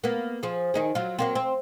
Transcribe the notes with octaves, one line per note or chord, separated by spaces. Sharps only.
A#3 B3
F3 G#4
D#3 D#4 G#4
F#3 F4
F#3 A#3 C4
C4